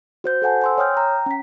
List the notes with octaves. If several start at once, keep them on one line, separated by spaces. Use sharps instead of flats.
F#4 C5 G6
A4 C5 F#5 G#5 A5
G#5 C6 E6
C#5 G5 D#6 F6 G6
G5 A#5
C#4 B6